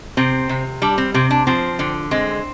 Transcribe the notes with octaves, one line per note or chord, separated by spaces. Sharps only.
C3 C4
C3
G3 D4
C4
C3 C4
D4
F3 C4
D3
G#3 C4